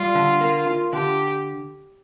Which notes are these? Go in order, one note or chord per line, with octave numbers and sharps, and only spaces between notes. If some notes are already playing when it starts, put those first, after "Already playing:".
Already playing: G3 F4
D3
A#3
F4
D3 G4